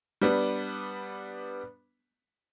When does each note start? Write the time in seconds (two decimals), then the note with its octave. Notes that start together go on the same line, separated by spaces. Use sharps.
0.22 G3 B3 D4